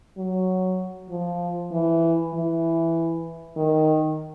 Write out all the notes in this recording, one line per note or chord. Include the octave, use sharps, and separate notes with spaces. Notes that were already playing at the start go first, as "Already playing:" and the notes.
F#3
F3
E3
E3
D#3